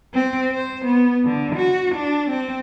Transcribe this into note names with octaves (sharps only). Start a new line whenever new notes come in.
C4
C5
B3
D3
F#4
D4
C4